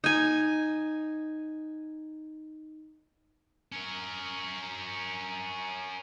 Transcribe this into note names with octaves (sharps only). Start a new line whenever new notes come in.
D#4 G#5
C#4 A#4